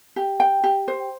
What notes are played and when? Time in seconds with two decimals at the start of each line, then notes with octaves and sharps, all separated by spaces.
0.16 G4
0.40 G5
0.64 G4
0.88 C5